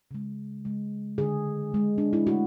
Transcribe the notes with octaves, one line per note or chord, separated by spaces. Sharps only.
C#3 G#3
C#3 G#3
D3 G#3 G#4
D3 G#3
D4
E4
D3 A3 F#4